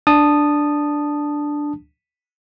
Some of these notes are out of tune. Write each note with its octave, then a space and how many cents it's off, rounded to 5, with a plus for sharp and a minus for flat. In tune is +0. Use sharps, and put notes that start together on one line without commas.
D4 +0 A5 +0 D#6 -15